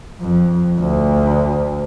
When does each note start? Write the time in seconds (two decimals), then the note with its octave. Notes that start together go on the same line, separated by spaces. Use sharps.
0.21 F2
0.80 D2